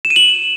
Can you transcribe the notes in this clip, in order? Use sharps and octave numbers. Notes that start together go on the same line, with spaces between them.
E7
D#7
F#7